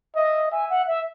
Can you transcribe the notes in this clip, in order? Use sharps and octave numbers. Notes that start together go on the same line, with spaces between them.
D#5 E5
E5 G#5
F#5
E5